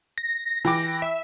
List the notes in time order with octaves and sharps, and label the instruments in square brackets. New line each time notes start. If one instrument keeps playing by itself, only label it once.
[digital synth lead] A#6
[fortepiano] E3 G5 D6 [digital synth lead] A#6
[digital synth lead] E5